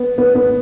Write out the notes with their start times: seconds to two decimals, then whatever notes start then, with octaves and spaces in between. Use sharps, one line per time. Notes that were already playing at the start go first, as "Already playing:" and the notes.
Already playing: B3
0.18 B3
0.35 B3